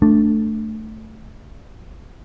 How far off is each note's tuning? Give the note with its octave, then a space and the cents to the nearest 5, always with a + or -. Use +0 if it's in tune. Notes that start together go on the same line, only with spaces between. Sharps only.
A3 +0 D4 +0